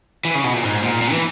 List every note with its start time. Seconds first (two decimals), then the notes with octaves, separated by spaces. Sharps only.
0.25 E3
0.35 C#3
0.44 B2
0.54 A#2
0.64 G#2
0.82 A#2
1.02 A#2
1.11 E3